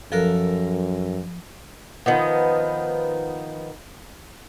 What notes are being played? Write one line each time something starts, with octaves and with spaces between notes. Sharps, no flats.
F#2 F3 A4 A#4 F#6
D#3 F3 B3